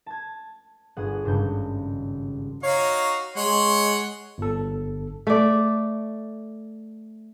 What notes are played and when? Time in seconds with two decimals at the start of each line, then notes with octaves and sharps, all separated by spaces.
0.06 A5 G#6
0.97 G1 G#4 F#5
1.24 G#1 G2 C#3 G6
2.63 D#4 F#4 C#5 F5
3.36 G#3 C#5 F#5 C6
4.38 G1 A4
5.27 A3 D5